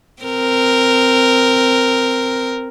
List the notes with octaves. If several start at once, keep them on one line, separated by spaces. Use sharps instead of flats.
C4 A#4